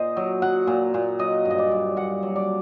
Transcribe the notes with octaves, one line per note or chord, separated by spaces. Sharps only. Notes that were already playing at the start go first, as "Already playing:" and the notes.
Already playing: A#2 C5 D#5
F#3
F#3 F#5
A#2
A#2
F#3 D#5
G2
D#5
D5
G2
G2 F#5
F#3
D5